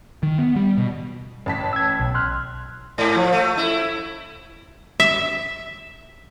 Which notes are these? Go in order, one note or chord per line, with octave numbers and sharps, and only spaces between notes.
D#3
B3
G3
B2
A1 A5 B6
E6 G#6
B1
C6 F6 F#6
G#2
F3
A3
E4
E5